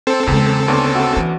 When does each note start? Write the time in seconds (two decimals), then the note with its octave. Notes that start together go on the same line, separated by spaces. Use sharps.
0.07 C4 A4 C5
0.27 E2 C#3 G#3
0.68 D2 B3 C#4 D4 C6
0.95 F#4 E5 A5
1.16 E3